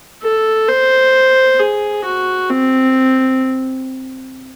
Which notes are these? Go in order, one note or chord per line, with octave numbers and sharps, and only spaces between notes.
A4
C5
G#4
F#4
C4